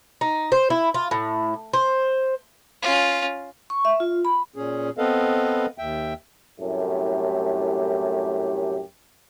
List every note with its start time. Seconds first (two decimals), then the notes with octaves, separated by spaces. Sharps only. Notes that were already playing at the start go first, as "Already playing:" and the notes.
0.21 D#4
0.52 C5
0.70 E4
0.94 F4
1.11 A2
1.73 C5
2.82 C#4 F4
3.70 C#6
3.85 E5
4.00 F4
4.25 B5
4.56 A#2 C#4 G#4
4.98 B3 C4 A4 B4 D#5 F5
5.78 D#2 E5 G5
6.59 C2 F#2 A2 A3 G4